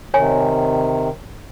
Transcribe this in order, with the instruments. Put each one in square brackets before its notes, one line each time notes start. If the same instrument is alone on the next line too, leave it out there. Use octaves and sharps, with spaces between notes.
[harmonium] C3 D#3 [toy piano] C#5 G#5